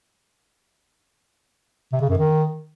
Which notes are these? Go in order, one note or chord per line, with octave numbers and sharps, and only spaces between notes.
C3
C#3
F#2
D#3